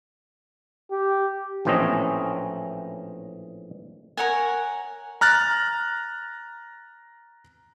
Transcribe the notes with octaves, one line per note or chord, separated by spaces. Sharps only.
G4
A#1 A2 E3 C4 C#4 D#5
A#4 C#5 F#5 G#5
A#5 F6 F#6 A6